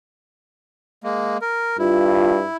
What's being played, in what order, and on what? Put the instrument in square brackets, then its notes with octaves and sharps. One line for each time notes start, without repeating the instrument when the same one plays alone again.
[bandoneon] G#3 A#3
A#4
[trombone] G2 [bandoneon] E4 [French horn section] F4